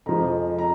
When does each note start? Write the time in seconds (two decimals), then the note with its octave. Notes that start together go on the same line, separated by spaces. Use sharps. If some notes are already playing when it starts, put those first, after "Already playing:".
0.06 F2 F3 G#3 A#5
0.59 A#5